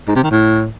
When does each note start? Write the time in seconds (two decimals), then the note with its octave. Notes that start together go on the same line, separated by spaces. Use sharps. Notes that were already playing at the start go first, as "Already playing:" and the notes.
0.08 G#2
0.16 C3
0.23 D#3
0.31 A2